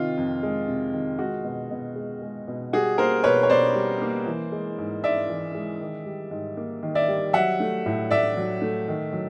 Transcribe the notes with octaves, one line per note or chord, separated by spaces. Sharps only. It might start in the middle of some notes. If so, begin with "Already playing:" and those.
Already playing: C3 D#3 F4
F2
G#3
C3
D#3
G#3 F#4
B2
B2
G#3
G#3
B2
G3 F#4 G#4
A#3 A#4 C5
B2 B4 C#5
C#5
B2 C5 D5
G3
A#3
E3
G#3
G#2
G#2 D5 E5
E3
G#3
D#3
G3
G#2
A#3
D#3
D5 E5
G3
F#3 E5 F#5
A3
A2
A2 D5 E5
F#3
A3
D#3
F#3